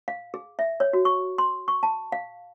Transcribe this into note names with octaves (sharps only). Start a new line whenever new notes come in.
F5
G#4
E5
C#5
F#4
C#6
C6
C#6
A5
F5